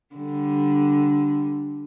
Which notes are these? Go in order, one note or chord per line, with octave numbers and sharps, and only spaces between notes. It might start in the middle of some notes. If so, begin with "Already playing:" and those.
D3 G3